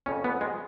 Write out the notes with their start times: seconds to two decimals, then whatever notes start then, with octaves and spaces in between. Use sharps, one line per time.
0.06 F2 C#3 C#4
0.24 B3
0.41 G#3